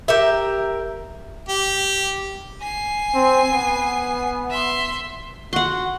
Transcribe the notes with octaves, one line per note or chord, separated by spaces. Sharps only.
G4 A#4 E5
G4
G#5 C7
C4
B3
E5 C6
F#4 F#5 C6